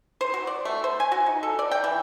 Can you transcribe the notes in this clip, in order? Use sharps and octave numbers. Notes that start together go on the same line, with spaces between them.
C5
F#4
D5
A3
C5
G#5
F#4
D#4
A4
D5
G5
E3